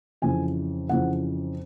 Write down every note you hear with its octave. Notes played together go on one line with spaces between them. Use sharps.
F2 C#3 E3 G#5
F2 C#3 E3 F#5